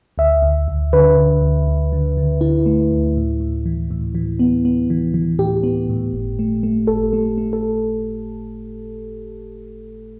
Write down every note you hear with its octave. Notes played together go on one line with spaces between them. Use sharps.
D2 E5
D2
D2
D3 B4
D3
D2
D2
D3
D3
D3 E4
A3
D2
A2
A2
E3
A2
E3
B3
B3
E3
E3
A2 G4
B3
A2
G1
A3
A3
G1 A4
A3
A3
A4